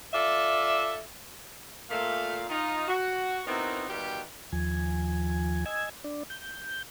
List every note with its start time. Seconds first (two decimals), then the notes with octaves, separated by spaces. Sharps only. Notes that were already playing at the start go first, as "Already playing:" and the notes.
0.14 F4 A4 D5 E5
1.89 A#2 A3 F5
2.49 D#4 F4
2.88 F#4
3.47 B3 C4 D#4 E4 F#4 A#4
3.88 B2 D#3 G3 B3 F4 G4
4.52 D#2 F3 G#5
5.66 D#5 G#5 E6 G#6
6.04 D4 D5
6.30 G6